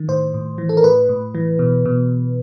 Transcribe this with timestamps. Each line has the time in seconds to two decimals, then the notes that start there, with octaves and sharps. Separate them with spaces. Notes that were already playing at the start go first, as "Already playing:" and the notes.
Already playing: D#3
0.08 A2 C5
0.34 A2
0.58 E3
0.69 A4
0.77 A#4
0.84 A2 B4
1.09 A2
1.35 E3
1.59 B2
1.86 B2